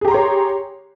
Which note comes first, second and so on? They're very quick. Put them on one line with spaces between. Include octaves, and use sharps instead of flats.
G#4 G4 A#5 C6 C#5